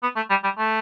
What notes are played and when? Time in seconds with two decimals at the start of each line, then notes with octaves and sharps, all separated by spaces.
0.03 B3
0.16 A3
0.30 G3
0.44 G3
0.58 A3